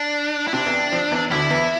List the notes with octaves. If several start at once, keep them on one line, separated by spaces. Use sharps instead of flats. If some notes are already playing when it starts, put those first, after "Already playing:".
Already playing: D4
E4
C3 D4
E2 E3
F2 F3
E2 E3
D2 D3 E4
E2 E3